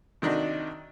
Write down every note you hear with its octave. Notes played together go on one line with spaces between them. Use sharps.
C3 D#3 D4 D#4 F#4